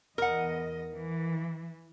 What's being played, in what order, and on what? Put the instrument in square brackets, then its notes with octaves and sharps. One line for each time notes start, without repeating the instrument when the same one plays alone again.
[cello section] E2 D#5 [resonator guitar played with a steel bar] A#4 F#5
[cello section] E3